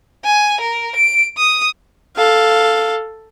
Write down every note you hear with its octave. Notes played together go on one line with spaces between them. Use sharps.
G#5
A#4
D7
D#6
A4 F5